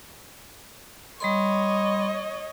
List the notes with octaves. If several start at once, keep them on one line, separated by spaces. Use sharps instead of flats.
G3 C#5 D#5 B5 C6